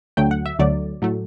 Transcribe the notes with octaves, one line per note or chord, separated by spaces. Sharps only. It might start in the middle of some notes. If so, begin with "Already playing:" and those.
D2 D3 F#3 A3 G5
F#5
E5
D2 D3 F#3 A3 D5
A2 F#3 A3